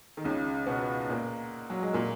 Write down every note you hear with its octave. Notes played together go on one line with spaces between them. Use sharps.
D#3
C#2 C#3
B2 B3
A#2 A#3
F#3
G#3
A#2 A#3